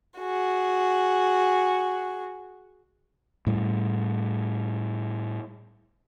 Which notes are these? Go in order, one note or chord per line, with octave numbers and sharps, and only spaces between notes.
F#4 G#4
A2 G3